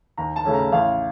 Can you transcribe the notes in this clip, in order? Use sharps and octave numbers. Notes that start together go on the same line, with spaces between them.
D#2 A#5
A5
C#3 A3 C#4
A#5
A1 F5